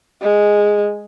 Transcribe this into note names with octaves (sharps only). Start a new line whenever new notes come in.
G#3